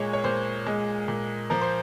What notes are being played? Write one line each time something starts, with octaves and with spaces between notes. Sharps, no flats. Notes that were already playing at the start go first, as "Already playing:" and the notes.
Already playing: A#2 G#3 C#5
C#5
A#2 C5
G#3
A#2
F3 A#4
C5